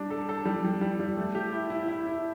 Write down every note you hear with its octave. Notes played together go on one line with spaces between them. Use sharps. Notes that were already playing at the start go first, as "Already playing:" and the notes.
Already playing: G3 D4
A4
A4
G3
G3
G3
G3
A3
G4
E4
E4
E4
E4